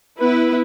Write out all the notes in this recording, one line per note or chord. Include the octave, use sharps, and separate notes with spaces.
B3 E4 B4